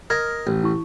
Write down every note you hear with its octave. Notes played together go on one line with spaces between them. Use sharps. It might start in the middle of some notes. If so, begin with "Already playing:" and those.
A#4 D#5 F6 G#6 A#6
A1
E4 C#6